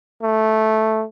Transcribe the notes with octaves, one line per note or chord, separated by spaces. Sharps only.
A3